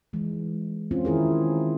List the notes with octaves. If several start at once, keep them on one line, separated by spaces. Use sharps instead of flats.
E3 G#3
C4 C#4 F4
D#3 E4 G#4 A#4